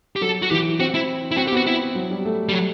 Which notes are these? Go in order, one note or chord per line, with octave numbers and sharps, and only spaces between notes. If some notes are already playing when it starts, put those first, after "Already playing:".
G4
F#3 A4
F#4
E3 G4
C4 F#4
E4
E4
C4 F#4
G4
B3 F#4
E4
F#3
G3
A3
G3
F#3